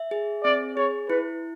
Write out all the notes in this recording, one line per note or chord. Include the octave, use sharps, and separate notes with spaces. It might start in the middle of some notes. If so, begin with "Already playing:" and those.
Already playing: E5
G#4
C4 D5
G#4 C#5
E4 B4